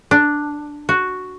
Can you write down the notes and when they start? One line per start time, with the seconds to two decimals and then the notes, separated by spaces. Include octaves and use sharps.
0.11 D4
0.89 F#4